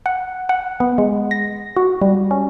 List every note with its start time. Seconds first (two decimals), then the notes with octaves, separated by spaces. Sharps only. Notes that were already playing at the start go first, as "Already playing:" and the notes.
0.06 F#5
0.49 F#5
0.80 B3
0.98 G#3
1.31 A#6
1.76 F#4
2.01 G3
2.31 C#4